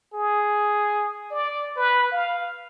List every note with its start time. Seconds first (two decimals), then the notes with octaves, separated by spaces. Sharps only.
0.14 G#4
1.31 D5
1.77 B4
2.12 F5